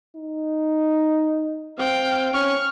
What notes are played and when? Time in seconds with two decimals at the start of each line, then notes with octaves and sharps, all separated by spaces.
0.15 D#4
1.79 C4 F5 G5
2.33 C#4 C#6 F6